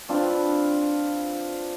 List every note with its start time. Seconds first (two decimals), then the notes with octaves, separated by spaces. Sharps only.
0.09 C4 D4 F4 B4